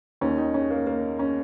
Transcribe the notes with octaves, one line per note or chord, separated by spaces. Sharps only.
D#2 D#3 C#4
D#4
C#4
A#3
A#3
C#4